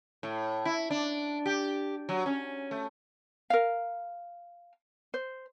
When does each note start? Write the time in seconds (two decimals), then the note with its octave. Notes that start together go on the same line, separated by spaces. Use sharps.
0.23 A2
0.65 E4
0.90 D4
1.46 G4
2.09 F#3
2.26 C#4
2.71 A3
3.50 A#4 F5
5.14 C5